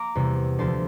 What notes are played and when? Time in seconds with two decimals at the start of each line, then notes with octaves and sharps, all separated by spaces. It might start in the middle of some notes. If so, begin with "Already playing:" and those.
Already playing: A#3 A#5 C6 D6
0.15 E2 C3 G3
0.58 D2 C3 F3 A5 C6